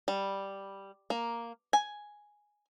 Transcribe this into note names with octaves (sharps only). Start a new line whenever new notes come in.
G3
A#3
G#5